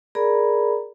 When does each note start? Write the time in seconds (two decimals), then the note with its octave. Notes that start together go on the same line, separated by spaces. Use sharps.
0.15 G#4 A#4 D5 A#5 B5